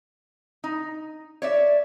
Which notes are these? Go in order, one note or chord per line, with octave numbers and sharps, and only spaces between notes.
D#4
C#5 D5 E5